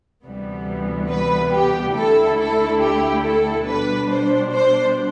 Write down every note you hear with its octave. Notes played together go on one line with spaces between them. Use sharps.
D2 C3 E3 G3 B3
B4
G4
D2 D3 A3 E4 A4
A4
G4
A4
B2 G3 D4 B4
C5
C5